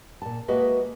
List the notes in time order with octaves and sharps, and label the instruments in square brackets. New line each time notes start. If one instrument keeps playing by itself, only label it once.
[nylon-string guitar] A#2 A5
G#3 A#3 F#4 B4 D#5 E5